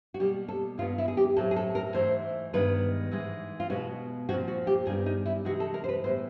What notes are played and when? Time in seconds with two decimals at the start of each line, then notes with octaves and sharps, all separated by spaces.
0.14 F#4
0.20 B2 G3 A#3 G4
0.48 A4
0.78 G2 D#3 G#3 B3 F4
0.98 E4
1.08 G#4
1.17 G4
1.36 A2 F#3 A3 C4 A4
1.51 G#4
1.56 A4
1.75 A#4
1.94 G#2 E3 A3 C5
2.53 G2 D#3 G#3 B3 B4
3.11 G#2 E3 G#3
3.60 F4
3.70 B2 G#3 B3 F#4
4.29 A#2 F3 G#3 C4 F#4
4.48 F#4
4.67 G4
4.87 G2 D#3 G3 B3 G#4
5.06 D#4
5.26 E4
5.45 C3 E3 G#3 F#4
5.60 A4
5.74 A#4
5.84 C5
5.89 B4
6.04 A2 E3 G3 B3 C5